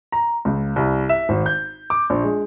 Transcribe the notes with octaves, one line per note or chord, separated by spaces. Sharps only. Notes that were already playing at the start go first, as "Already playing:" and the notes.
A#5
C#2
C2
E5
G#1
G6
D6
A#1
G#3